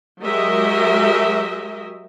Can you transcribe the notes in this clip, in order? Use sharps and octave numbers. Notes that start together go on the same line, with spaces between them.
F#3 G#3 G4 A#4 D#5 E5